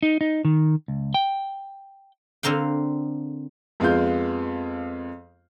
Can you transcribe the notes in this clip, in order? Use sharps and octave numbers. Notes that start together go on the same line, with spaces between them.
D#4
D#4
D#3
C#2
G5
D3 C4 A#4 F5 G5
F2 G#3 B3 F4 F5 G6